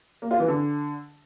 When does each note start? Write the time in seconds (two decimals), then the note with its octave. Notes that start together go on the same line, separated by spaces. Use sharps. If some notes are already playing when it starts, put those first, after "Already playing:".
0.22 A#3
0.31 F4
0.39 E3
0.48 D3